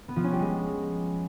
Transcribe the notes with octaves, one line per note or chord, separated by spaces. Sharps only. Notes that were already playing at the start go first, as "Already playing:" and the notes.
B3
F3
C#4
G3
G#3